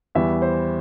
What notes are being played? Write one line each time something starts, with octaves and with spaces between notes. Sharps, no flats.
E2 E3 G3 E5
C5